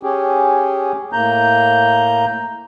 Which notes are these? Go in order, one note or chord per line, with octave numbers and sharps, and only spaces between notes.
C#4 G4 G#4
A2 A#3 A#5 G6